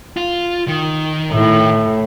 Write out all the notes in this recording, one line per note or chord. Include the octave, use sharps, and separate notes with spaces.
F4
D#3
A2